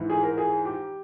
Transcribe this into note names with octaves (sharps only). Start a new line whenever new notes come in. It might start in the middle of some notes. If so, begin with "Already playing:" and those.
Already playing: G#2 E3
G#4
A#4
G#4
G4